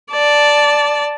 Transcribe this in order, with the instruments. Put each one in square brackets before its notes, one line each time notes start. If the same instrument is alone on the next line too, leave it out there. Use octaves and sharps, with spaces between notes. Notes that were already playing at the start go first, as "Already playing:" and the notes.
[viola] D5 A5